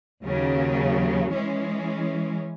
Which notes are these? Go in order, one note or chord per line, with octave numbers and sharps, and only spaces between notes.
D#2 C#3 F#3
E3 G#3 C#4